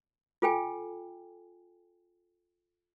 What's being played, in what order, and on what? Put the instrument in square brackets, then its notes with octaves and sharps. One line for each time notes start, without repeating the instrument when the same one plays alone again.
[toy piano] F4 A4 G5 G#5